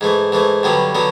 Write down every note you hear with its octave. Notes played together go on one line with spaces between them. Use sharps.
G#2 E3 A3
G#2 E3 A3
G2 D3 F#3 B3
D3 F#3 B3